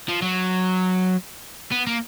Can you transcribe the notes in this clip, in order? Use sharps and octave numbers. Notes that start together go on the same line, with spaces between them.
F3
F#3
B3
A#3